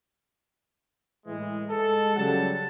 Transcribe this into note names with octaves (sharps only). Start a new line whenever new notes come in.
A2 E3 G#3
G#3 A4
C#3 F#3 G3 F#5 A5